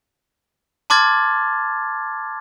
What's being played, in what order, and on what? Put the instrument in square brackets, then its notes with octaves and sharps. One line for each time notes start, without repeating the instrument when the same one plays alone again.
[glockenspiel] A5 C6 D6 F6 G#6 A6